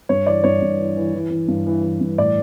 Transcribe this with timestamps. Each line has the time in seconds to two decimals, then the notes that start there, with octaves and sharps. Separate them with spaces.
0.09 G2 C#5
0.26 E3 D5
0.44 G2 C#5
0.62 G2
0.79 E3
0.97 E3
1.14 E3
1.30 E3
1.48 G2
1.67 E3
1.83 E3
2.01 G2
2.18 A2 D5